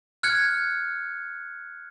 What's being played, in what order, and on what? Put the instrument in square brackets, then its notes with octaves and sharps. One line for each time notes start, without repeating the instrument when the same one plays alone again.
[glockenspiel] F6 F#6 G#6 C#7